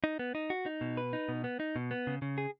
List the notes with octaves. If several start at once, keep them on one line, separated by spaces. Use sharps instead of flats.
D#4
B3
D#4
F#4
D#4
B2
B4
D#4
B2
B3
D#4
B2
B3
C#3
C#3
G#4